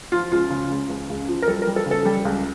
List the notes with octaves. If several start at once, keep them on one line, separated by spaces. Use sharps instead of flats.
F3 F4
C#2 F4
C#3
C#2
C#2
C#2
F3
A#4
G3 A4
A#4
G3
A4
C#3
A4
G3
C#2